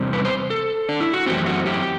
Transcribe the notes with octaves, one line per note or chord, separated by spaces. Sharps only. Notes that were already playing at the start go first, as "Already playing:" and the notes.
Already playing: E2 C3 G3 C4
B4
C5
A4
D4
E4
F#4
F#2 E3 A3 C4 G4
F#4
G4